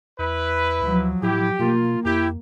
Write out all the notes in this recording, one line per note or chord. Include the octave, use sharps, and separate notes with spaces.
E2 E4 B4
D2 F3 F#3
A2 E4 G4
B2 A#3 F4
F2 E4 G4